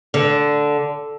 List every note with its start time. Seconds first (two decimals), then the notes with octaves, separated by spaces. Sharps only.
0.14 D3